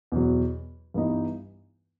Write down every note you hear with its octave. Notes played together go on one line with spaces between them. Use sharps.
E2 B2 F#3
G2 E3 B3 D#4